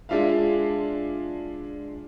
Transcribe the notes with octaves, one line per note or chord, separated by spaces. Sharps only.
G#3 D4 F4 E5 F5